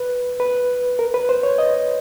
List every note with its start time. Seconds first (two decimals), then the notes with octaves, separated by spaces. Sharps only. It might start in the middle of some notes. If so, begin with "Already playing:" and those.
Already playing: B4
0.40 B4
0.99 A#4
1.14 B4
1.29 C5
1.43 C#5
1.58 D#5